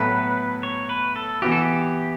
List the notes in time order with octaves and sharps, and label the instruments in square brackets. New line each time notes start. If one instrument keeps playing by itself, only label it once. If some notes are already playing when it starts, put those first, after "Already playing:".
Already playing: [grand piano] A2 F#3 B3 F#4 A4 [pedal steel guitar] B4
[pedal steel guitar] C#5
B4
A4
[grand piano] E3 B3 F#4 [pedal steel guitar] G4
[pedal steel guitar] A4
G4